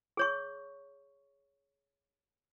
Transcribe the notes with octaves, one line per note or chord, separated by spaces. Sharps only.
G#4 C#5 C#6